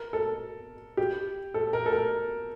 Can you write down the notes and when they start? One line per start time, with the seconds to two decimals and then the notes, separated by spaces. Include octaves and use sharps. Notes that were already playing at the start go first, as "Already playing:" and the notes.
Already playing: A#4
0.13 A4
0.97 G4
1.54 A4
1.73 A#4
1.86 A4
1.93 A#4